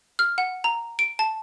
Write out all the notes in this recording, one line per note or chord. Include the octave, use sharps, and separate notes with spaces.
F6
F#5
A#5
D7
A5